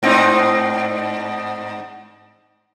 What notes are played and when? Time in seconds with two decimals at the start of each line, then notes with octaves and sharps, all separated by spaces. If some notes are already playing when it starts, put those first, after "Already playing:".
0.03 G#2 C4 D#4